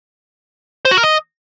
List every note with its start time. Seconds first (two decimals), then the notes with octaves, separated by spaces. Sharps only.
0.85 C5
0.91 F#4
0.97 A#4
1.03 D#5